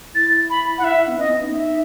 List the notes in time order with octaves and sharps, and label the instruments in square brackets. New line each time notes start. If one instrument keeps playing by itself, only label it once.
[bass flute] E4 [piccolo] A6
[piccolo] B5
F#5
[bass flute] E4 [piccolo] E5
[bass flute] E4
B3
[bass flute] C#4 [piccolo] D#5
[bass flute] B3
D#4
[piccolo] E5